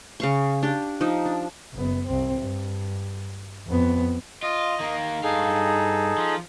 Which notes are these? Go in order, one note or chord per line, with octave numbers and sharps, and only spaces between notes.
C#3 F5 C#6
D4 G4
F3 D#4
D4
F#1 B3
C2 C4
G2
F2 B3
F4 D#5
D#3 A#3
G2 D#4 G#4 A4 F5
F3